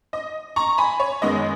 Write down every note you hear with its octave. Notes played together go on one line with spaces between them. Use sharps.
D#5
A#5 C#6
G#5 B5
C#5
F#2 D#3 G#3 B3 D#5